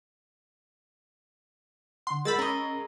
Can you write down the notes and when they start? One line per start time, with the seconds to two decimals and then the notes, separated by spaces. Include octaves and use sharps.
2.07 D3 F#5 C6
2.25 G#3 A#4 F#5 B5 E6 G6 A6
2.39 C#4 A#4 D#5 C#6